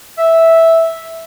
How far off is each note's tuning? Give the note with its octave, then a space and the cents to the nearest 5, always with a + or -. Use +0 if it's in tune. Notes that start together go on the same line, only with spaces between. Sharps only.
E5 -5